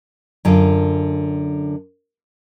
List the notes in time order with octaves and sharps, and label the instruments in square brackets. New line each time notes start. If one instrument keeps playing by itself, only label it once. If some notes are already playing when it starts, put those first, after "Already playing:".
[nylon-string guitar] F#2 D3 F4